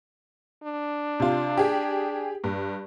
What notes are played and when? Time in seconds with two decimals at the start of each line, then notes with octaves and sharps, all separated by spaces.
0.64 D4
1.20 C3 F4
1.57 G4 G#4
2.44 G2